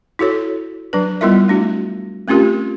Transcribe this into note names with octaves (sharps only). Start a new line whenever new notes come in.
E4 F#4 A4 C#5
F#3 D4 B4
G3 B3 E4 F4 A#4 E5
A3 D4 F#4
A3 C4 C#4 F4 G4 A#4